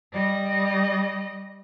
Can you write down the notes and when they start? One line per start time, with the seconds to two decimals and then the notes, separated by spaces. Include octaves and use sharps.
0.14 G3 D#5